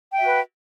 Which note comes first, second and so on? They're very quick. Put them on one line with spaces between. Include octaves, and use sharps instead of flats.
G5 E5 F#4 B4